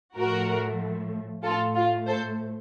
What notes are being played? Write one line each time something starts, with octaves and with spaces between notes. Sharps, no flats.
A2 F3 A3 F#4 A#4
A2 A3 F4 A4
F4
A4 C5